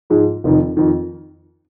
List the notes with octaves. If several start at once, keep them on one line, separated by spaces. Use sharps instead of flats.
G#2 F3 G#3
F1 F2 D#3
F2 D#3